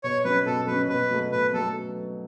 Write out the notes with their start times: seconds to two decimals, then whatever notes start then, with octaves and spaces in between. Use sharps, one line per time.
0.04 B2 C#5
0.25 F#3 C#4 B4
0.46 B2 A4
0.67 F#3 B4
0.72 C#4
0.88 B2 B4
1.10 F#3 A3
1.32 B2 B4
1.53 F#3 A3 A4